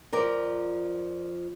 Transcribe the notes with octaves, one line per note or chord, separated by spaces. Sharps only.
F2 F3 A#4 D5